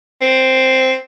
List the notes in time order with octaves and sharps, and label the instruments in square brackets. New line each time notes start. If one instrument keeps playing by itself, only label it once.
[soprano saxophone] C4